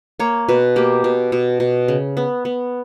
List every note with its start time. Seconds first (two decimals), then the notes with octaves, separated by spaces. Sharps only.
0.20 A#3 C#5
0.49 B2 B4
0.76 A#3 G4
1.04 B2
1.32 B2
1.60 B2
1.88 C#3
2.17 B3
2.45 B3